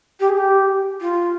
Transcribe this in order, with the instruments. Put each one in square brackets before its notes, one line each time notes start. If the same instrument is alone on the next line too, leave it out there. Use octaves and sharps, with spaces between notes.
[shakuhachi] G4
G#4
G4
F4